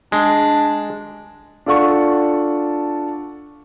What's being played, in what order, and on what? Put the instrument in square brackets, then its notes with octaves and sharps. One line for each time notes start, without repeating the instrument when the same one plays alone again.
[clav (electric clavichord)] G#3 [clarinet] D4
[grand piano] D4 F4 A4 F#5 C#6